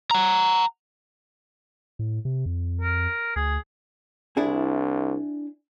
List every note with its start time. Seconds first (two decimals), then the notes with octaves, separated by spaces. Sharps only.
0.11 F#5 A#5
1.99 A2
2.25 C3
2.46 F2
2.81 A#4
3.36 D2 G#4
4.37 C2 D4 E4 G#4